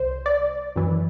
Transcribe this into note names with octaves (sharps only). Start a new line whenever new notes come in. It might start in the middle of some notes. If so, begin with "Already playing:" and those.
Already playing: C2 C5
D5
F#2 E3